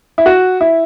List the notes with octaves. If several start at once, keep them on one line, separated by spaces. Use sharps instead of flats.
E4
F#4
E4